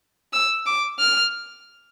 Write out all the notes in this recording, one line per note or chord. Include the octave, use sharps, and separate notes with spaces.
E6
D6
F6